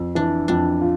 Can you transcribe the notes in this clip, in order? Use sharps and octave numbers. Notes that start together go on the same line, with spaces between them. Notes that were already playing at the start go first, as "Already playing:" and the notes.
Already playing: F2
E3 D4
F2 D4
F4